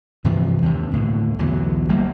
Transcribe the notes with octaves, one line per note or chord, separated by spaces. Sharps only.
G2 C3 E3 F3
D#2 C3
D#2 A2 D3
B1 E2 D3 F#3
G1 G3 A#3